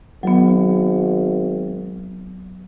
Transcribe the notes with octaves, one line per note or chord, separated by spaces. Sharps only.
G#1 F#3 B3